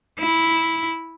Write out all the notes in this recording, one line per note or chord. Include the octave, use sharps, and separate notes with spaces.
E4